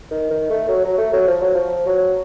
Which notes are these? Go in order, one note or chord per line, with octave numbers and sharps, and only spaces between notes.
D#3
D#3
A3
F#3
F#3
A3
F#3
F3
F#3
F3
F#3